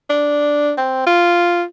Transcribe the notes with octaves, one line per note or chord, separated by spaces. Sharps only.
D4
C4
F4